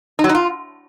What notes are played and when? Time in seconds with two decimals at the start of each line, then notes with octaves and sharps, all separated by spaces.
0.19 D#4
0.24 F#3
0.29 D#4
0.35 F4